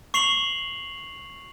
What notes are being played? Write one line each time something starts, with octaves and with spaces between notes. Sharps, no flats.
C#6 C7 F7 F#7